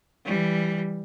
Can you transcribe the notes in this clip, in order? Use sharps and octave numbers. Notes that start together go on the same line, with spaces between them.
E3 G3